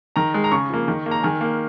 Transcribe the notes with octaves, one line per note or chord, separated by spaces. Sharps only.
D#3 A#5
G#3
A#5
C#3 C#6
F3 A#3
D#3
A#3
A#5
D#3 G#5
A#3